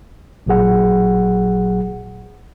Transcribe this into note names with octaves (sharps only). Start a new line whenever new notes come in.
A1 A#2 F#3 G#4 F#5